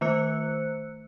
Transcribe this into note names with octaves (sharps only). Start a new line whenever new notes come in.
D#3 A3 C5 E6 F#6 C#7